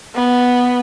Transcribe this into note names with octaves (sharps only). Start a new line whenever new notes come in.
B3